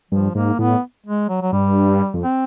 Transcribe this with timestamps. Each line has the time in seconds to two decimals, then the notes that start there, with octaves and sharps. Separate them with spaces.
0.11 G2 F3
0.35 G#2 A#3
0.59 A2 B3
1.06 G#3
1.29 F#3
1.42 F#3
1.52 G2 G3
2.14 F2
2.23 C4